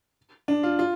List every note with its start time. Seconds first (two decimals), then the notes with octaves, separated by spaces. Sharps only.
0.48 D4
0.63 F4
0.79 F4